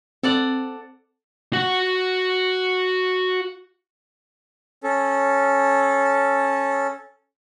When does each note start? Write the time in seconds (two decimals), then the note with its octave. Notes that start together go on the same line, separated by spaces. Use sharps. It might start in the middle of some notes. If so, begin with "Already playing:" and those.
0.23 C4 A4 D5 F#5
1.53 F#4 F#5
4.83 C#4 A4